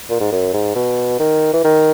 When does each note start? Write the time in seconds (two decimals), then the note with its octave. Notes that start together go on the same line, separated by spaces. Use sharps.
0.10 A#2
0.20 G#2
0.32 F#2
0.53 G#2
0.75 B2
1.19 D#3
1.53 E3
1.64 D#3